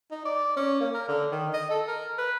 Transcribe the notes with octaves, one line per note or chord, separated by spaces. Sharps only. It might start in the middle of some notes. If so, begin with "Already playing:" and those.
D#4
D5
C#4
A#3
A#4
D3
D#3
D#5
A4
A#4
B4